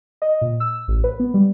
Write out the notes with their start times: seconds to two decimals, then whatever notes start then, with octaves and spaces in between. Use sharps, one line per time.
0.22 D#5
0.41 A#2
0.60 E6
0.88 A1
1.04 B4
1.20 B3
1.34 G3